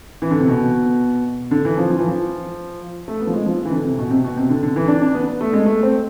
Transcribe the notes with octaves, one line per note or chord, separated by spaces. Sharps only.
E3
D3
C3
B2
D3
E3
F3
F3
E3
F3
A3
B3
F3
G#3
F3
E3
D3
C3
B2
C3
B2
C3
D3
D3
E3
D4
D4
B3
B3
A3
G#3
A3
C4